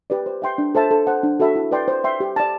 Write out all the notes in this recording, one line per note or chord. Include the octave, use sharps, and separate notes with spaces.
G4 B4 D5
C5
E5 G5 C6
D4
A4 C5 E5 A5
A4
C5 F#5
D4
F#4 A4 E5 B5
E4
B4 D5 G5 C6
C5
E5 G5 C6
G4
D5 A5